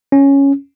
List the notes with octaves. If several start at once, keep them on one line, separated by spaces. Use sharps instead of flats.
C#4